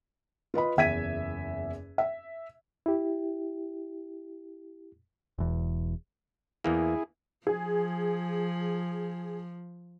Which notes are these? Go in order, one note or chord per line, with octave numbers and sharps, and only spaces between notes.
F4 B4 D#5 B5
F#1 E2 E5 G#6 B6 D#7
E5
E4 G4
E1 E2
E2 E3 A#3 E4 G#4
F3 G#4